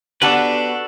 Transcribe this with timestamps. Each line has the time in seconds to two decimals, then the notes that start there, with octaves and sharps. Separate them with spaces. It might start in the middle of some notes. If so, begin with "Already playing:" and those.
0.22 B3 D4 F#4 G4 A4 B4 A5